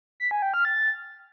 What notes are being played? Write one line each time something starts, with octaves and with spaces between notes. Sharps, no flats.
B6
G#5
G5
F6
A6